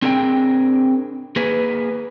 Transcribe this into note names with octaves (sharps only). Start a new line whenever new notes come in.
C4 D4 G#4 A#4 F5 G5
A#3 G#4 B4